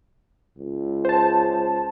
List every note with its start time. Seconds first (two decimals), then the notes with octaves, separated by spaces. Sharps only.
0.58 C#2
1.05 C5 A5